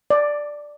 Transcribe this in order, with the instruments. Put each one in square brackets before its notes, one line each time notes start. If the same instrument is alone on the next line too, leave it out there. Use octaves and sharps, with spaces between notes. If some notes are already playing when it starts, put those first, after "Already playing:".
[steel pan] D5